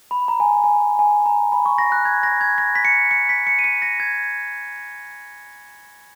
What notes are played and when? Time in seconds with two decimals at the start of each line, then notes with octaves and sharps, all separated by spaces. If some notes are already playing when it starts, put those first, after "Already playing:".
0.11 B5
0.28 A#5
0.40 G#5
0.64 G#5
0.99 G#5
1.26 A#5
1.52 B5
1.66 C#6
1.78 A#6
1.92 F#6
2.05 G#6
2.23 A#6
2.41 G#6
2.58 A#6
2.75 B6
2.85 C#7
3.11 C#7
3.29 B6
3.47 C#7
3.59 D#7
3.64 C#7
3.82 A#6
4.00 G#6